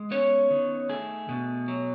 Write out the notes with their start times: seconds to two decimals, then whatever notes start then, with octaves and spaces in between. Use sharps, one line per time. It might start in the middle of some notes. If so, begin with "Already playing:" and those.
Already playing: G#3
0.11 B3 C#4 C#5
0.51 D#3
0.89 A3 G#4
1.29 B2
1.68 F#3